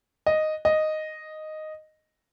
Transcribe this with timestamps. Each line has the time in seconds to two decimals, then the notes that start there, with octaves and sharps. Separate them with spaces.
0.26 D#5
0.65 D#5